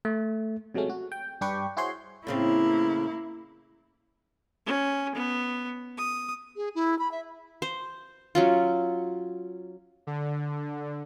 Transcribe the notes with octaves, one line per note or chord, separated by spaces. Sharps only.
A3
C3 F#3 G#3 A3 C#4
F#4
G5
G2 D4 G4 B4 G5 C#6
E4 F#4 G#4 C5 C#5 C6
A2 C#3 A#3 C4 E4
C#4
B3
D#6
G#4
E4
B5
E5
C5
F#3 C#4 F4
D3